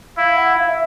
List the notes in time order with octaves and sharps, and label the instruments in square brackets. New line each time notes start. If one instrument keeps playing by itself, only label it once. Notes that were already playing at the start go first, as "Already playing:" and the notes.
[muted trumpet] E4 [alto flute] F5
[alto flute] F#5
F5
E5